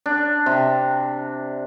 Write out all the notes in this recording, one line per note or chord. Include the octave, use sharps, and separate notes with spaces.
D4
C3